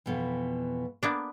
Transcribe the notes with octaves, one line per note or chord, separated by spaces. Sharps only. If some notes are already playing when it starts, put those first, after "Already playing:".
F2 B2 E3
A#3 B3 D4